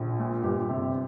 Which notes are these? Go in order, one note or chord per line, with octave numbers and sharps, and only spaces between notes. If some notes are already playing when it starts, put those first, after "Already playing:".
Already playing: A#1
A#2
G1 G4
C3